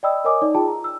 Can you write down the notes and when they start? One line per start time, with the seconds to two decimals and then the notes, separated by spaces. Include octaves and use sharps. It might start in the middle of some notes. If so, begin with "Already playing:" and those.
0.03 D5 D#5 G5 B5 D#6 E6
0.24 A#4 C#5 D#5 G#5 D6 D#6
0.42 D#4 D5
0.54 F4 G#4 G5 A5
0.68 A#5
0.84 E6